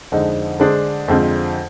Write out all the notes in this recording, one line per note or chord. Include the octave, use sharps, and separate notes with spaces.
F2 D3 G#3 D#4
D3 G#3 D4 G#4 C5
F2 D3 G#3 C4 F4